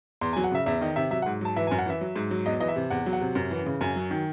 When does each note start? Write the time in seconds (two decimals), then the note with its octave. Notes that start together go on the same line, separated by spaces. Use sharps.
0.21 E2 C6
0.33 G#5
0.36 F#3
0.44 F#5
0.52 C#3 E5
0.66 E2 E5
0.81 D#3 D#5
0.96 C3 E5
1.11 F#3 E5
1.22 F#5
1.26 G#2
1.41 F#3 A5
1.56 E3 E5
1.67 G#5
1.71 F#2
1.79 F#5
1.86 E3 E5
2.01 F#3
2.16 G#2
2.31 F#3
2.46 E2 D#5
2.60 E3 D#5
2.68 E5
2.76 C3
2.90 E2 F#5
3.06 F#3
3.13 F#5
3.21 C3
3.35 F#2
3.51 E3
3.66 C#3
3.81 F#2 G#5
3.96 F#3
4.11 D#3